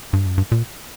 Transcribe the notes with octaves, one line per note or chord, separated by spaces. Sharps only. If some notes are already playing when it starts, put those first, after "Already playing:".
G2
F#2
G2
A#2